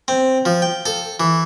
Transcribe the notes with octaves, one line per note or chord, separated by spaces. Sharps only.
C4
F3
G5
A4
E3